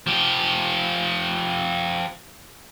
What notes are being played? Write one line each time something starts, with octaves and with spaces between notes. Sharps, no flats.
F3 G4